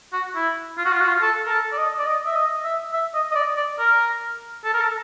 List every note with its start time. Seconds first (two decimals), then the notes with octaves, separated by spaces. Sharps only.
0.13 F#4
0.35 E4
0.78 F4
0.85 F#4
0.93 F4
1.01 F#4
1.08 F4
1.22 A4
1.46 A#4
1.49 A4
1.72 D5
1.78 D#5
1.99 D5
2.07 D#5
2.26 E5
2.36 D#5
2.65 E5
2.93 E5
3.15 D#5
3.32 D#5
3.35 D5
3.57 D5
3.79 A#4
4.65 A4
4.74 A#4
4.81 A4